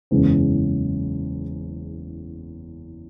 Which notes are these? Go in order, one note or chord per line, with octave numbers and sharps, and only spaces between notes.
F#1 E2 C#3 G#3 C#4